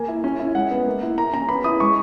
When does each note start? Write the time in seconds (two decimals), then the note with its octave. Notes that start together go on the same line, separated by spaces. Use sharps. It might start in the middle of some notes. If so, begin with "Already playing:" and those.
Already playing: A#3 G#5
0.08 E4
0.24 C#4
0.39 E4
0.55 G#3 F#5
0.71 B3
0.87 A#3
1.03 E4
1.18 A#3 A#5
1.33 C#4 A#5
1.49 B3 B5
1.64 E4 D#6
1.80 G#3 C#6